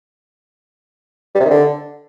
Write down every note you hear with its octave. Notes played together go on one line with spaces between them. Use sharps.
G3
C3
D#3
D3